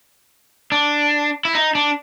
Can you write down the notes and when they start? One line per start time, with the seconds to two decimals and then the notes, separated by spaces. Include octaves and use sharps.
0.72 D4
1.45 E4
1.55 D#4
1.75 D4